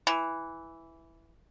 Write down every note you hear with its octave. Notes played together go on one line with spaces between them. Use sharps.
E3